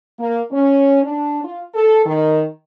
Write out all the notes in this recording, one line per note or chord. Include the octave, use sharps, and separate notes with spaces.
A#3
C#4
D4
F4
A4
D#3